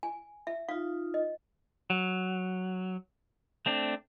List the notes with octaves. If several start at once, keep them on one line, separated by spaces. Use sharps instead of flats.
G#5
E5
D#4 F4 F5
D#5
F#3
A3 C4 D4